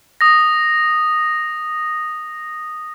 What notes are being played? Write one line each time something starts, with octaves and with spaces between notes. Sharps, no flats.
D#6 A#6